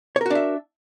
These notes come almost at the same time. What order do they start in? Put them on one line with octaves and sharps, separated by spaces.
C#5 A#4 F#4 D4 E5